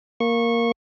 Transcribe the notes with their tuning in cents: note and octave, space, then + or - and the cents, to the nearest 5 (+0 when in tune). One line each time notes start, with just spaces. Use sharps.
A#3 +0 C#6 -20